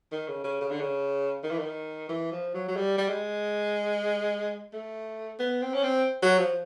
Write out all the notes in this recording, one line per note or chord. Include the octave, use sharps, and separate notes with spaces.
D#3
C#3
C#3
C#3
D3
C#3
D#3
E3
D#3
E3
F3
F#3
F#3
G3
G3
G#3
A3
B3
C4
C#4
C4
F#3
F3